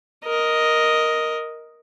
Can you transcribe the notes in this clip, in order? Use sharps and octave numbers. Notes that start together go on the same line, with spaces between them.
A#4 D#5